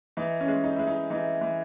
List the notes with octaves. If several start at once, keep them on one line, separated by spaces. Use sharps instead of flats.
E3 D#4
C#4
G#3
D#4
G#3 E4
D#4
E3 D#4
E3